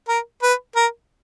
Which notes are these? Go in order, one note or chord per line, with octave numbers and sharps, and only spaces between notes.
A#4
B4
A#4